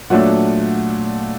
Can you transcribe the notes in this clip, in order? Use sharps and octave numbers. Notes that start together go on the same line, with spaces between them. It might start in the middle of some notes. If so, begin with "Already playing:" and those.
A#2 F#3 A3 D4 F#5